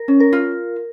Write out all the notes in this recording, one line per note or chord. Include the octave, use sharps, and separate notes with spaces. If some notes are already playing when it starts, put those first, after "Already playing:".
Already playing: A#4
C#4
A#4
F4